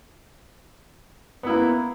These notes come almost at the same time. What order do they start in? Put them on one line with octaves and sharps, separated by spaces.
B3 E4 A#3